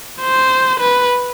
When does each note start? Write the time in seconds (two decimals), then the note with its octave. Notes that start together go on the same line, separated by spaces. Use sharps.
0.21 C5
0.79 B4